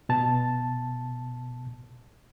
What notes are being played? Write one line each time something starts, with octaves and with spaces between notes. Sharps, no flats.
B2 A5